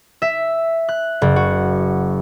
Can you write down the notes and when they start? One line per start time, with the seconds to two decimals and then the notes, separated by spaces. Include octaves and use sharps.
0.22 E5
0.89 F#6
1.22 F#1
1.36 F#4